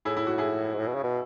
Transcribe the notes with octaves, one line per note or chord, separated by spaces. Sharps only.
A2 E4 G#4
E4
F#4
E4 G#4
G#2
A2
B2
C#3
B2